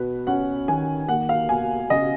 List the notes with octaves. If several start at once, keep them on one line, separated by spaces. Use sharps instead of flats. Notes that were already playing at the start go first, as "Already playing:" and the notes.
Already playing: B2 B4
C#4 F#5
D#3 G#5
A#3 F#5
F5
B2 G#5
C#3 D#5